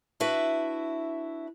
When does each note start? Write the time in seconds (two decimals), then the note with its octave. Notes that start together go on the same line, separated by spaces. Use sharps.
0.20 D4 E4 F#4 B4 E5